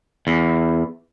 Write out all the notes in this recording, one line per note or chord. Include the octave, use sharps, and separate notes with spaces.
E2